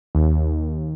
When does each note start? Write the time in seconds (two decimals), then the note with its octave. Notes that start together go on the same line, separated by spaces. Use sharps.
0.15 D#2